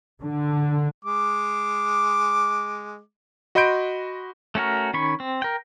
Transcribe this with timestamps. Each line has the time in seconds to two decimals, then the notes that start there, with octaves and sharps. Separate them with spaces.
0.22 D3
1.05 G#3 D6
3.55 F#4 D#5 B5 C6 G6 D7
4.55 A3 C#4 F#4 A#4
4.93 D#3 C#4 B5 C#6
5.20 C4
5.42 A#4 G5